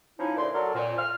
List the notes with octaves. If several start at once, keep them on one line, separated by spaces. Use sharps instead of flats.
F3 C#4 D#4 E4
D2 A#2 D5 C6
F#3 A4 A#4 D5
F2 A#2
F6